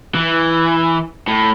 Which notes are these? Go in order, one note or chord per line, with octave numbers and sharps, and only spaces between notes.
E3
A2